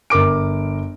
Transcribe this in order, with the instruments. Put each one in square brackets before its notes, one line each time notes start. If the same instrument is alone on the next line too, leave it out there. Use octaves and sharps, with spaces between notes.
[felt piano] G1 A#4 D6 D7